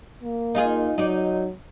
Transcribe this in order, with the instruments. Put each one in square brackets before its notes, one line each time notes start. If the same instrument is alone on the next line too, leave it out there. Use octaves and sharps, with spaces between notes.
[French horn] A#3
[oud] D#4 F4 G#4
[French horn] F#3 [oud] D#4 D5